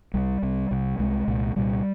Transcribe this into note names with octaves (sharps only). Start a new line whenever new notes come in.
C2 C3 G3
C2 C3
C2 C3
C2 C3 G#3
C2 A#2
C2 A#2 G3